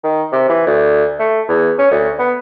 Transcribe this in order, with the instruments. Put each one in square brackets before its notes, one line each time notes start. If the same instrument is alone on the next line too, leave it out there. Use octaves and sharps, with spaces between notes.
[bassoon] D#3
C3
E3
D2
A3
E2
C#4
D2
B3